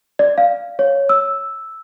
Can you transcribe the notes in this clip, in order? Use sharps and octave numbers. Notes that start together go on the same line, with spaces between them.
D5
F5
C#5
E6